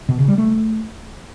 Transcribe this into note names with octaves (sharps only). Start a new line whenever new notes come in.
B2
C#3
G3
A3